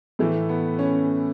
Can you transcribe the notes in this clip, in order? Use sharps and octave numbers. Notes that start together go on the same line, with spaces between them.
A2 E3 A3
B3
C#4